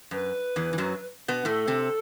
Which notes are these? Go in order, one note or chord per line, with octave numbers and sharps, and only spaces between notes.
F#2 B4
E2 E3
E3
F#2 F#3
B2 B3
A2 A3 A4
C3 C4